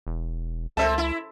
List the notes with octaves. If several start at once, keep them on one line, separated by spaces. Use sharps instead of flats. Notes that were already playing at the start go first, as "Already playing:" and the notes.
E1
C#2 A3 C4 A4 E5 A5
E4